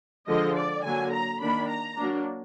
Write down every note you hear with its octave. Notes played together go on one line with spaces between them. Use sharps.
D3 F3 G#3 D#5
D5
D3 F#3 A#3 G#5
A#5
D#3 A#3 D4 B5
A#5
F#3 A#3 D4